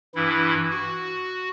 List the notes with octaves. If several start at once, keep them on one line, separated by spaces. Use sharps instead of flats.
G2 E3 E4
F#4